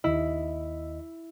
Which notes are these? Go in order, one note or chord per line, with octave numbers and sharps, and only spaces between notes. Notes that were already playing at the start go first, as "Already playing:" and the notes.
D#2 E4 D#5